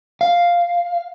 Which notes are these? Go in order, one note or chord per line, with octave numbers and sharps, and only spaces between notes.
F5